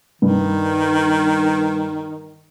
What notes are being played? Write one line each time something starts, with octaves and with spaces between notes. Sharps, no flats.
G2 D#3